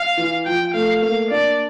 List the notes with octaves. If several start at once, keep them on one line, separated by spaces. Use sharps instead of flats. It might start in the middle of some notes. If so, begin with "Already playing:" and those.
Already playing: F5
E3
F3 G5
A3 F5
A#3 F5
D4 D5